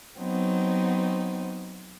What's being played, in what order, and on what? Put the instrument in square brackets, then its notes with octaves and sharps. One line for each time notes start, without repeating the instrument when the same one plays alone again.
[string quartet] F#3 B3 C4 D#4